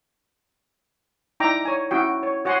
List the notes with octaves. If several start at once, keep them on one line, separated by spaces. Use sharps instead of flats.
D#4 E4 D5 G5 A#5 D6
C#5 G#5
C#4 E4 F#4 G5
C#5
F#4 C#5 F#5 G#5 C6